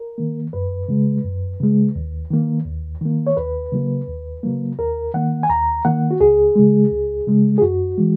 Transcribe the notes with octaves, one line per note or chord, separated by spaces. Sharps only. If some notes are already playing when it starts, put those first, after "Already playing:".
Already playing: A#4
D#3 A#3
F#2 B4
C#3 G#3
F#2
C#3 G#3
D#2
D#3 A#3
D#2
D#3 A#3
C#5
D#2 B4
C#3 F#3 A#3
D#2
C#3 F#3 A#3
D#2 A#4
D#3 A#3 F#5
G#5
D#2 A#5
D#3 A#3 F#5
F#4
C#2 G#4
C#3 G#3
C#2
C#3 G#3
G#4
F#2 F#4
E3 G#3